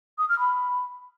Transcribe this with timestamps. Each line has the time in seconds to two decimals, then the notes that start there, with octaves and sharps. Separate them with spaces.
0.18 D#6
0.29 F6
0.40 B5